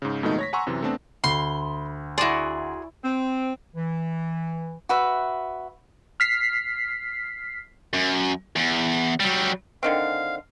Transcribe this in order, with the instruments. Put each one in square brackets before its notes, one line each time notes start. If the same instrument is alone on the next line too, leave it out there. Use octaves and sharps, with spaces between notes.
[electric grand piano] G#2 C#3
F2 B2 D#3 G#3 A3 D#4
C#5 A#6 B6
F#5 G#5 A#5 C6 C#6 E6
F#2 C3 E3
A3 B3 C4 D4 A5
[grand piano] D2 [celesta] B5 [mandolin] C6
[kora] E4 D5 [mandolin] F#4 G#4 [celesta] C6
[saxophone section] C4
[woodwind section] E3
[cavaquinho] F#4 B4 E5
[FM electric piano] F6 B6 C7
[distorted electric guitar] F#2
E2
F#3 G3
[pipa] D3 D#3 C4 [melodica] F5